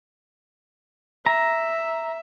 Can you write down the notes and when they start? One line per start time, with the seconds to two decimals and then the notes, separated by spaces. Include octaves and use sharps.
1.26 E5 A#5